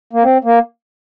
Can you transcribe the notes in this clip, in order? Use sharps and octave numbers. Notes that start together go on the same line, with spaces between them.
A#3
C4
A#3